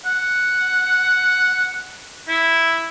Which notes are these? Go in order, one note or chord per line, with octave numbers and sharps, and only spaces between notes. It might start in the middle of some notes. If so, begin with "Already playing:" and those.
F#5
E4